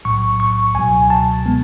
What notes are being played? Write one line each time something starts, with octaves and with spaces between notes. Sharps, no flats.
B1 A2 F#3 C#6
C#6
C#2 B2 F#3 G#5
A5
B2 G#3 B3